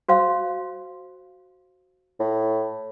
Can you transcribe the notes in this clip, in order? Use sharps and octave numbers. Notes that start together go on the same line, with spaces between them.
F#4 C5 F5
A2